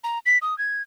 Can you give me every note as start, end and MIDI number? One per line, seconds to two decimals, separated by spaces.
0.04 0.19 82
0.26 0.38 95
0.42 0.57 87
0.58 0.82 92